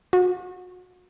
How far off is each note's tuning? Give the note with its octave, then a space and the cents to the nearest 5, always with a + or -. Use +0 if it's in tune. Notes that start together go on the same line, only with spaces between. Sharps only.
F#4 -35